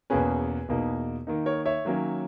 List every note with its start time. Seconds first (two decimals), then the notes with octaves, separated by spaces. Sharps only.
0.10 E2 B2 A#3 C#4 G#4 B4
0.68 E2 B2 A#3 D#4
1.27 D#3 A#3 D#4
1.46 A#4 C#5
1.65 C#5 E5
1.85 D#3 F#3 A#3 C#4